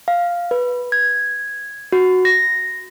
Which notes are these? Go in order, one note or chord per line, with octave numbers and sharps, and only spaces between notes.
F5
B4
G#6
F#4
A#6